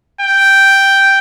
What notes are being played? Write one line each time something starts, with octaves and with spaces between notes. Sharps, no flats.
G5